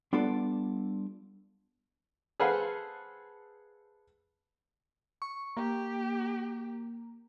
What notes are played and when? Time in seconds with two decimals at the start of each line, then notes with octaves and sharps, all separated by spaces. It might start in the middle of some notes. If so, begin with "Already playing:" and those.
0.13 G3 B3 D4 F4 A4 D5
2.40 G#4 A4 B4 C5 F5 F#5
5.22 C#6
5.57 A#3 G4